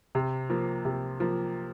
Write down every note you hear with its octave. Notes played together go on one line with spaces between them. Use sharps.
C3
F3 A#3
C3
F3 A#3